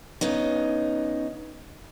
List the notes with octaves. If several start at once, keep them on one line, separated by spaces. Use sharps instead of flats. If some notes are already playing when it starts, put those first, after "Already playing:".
C#3 B3 D#4